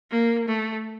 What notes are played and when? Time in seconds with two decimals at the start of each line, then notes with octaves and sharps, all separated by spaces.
0.11 A#3
0.47 A3